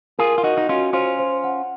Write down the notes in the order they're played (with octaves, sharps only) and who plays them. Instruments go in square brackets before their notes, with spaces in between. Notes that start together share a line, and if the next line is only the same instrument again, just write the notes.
[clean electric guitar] F4 G#4 [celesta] A#4
[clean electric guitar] F4
[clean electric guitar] D#4 F#4 [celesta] D#5
[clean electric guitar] D#4
[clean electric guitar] C#4 F4 [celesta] F#4
[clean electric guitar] C#4 F4 [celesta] C5
[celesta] C5
F#5